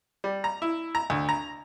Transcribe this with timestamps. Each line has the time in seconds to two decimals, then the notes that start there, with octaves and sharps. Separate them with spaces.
0.24 G3
0.44 A#5
0.62 E4
0.95 A#5
1.10 D2
1.29 A#5